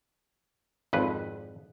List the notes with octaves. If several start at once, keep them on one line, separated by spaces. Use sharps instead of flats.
G#1 F2 B4